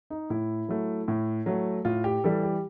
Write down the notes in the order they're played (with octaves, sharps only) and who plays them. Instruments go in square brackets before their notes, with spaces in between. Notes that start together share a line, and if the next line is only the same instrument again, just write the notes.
[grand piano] D#4
A2 E4
F#3 A3
A2
F#3 A3
A2 F4
G4
E3 G3 A4
G4